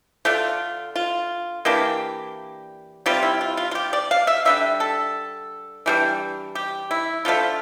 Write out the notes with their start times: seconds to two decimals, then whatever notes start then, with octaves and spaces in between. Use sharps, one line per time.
0.25 D3 A3 D4 F4
0.96 F4
1.65 E3 A#3 D4 G4
3.06 C3 G3 C4 F4
3.23 E4
3.41 F4
3.57 F4
3.71 F4
3.75 G4
3.93 D5
4.11 F5
4.27 E5
4.45 D3 G3 D4 E5
4.80 A4
5.86 E3 G3 D4
6.55 G4
6.91 E4
7.25 D3 F3 A3 F4